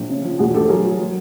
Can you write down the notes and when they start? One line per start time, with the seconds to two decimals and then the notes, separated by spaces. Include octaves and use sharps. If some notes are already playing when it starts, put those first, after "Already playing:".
Already playing: A#1
0.10 C#3
0.25 F3
0.39 E1 F#4 G#4
0.54 D2 G4 A4
0.69 F#3 G#4 A#4
0.84 F#3
1.00 F#3